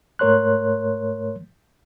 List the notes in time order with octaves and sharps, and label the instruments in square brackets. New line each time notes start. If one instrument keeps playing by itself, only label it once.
[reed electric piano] G#2 A3 A#4 C#5 C6 F#6